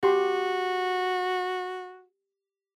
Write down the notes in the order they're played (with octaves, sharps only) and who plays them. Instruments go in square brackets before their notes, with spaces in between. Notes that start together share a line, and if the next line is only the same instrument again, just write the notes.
[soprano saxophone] F#4 [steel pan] G4 C6